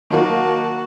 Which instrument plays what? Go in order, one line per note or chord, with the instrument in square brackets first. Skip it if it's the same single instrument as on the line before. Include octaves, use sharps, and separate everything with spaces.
[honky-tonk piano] D#3 F#3 A#3 [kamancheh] F#4 A5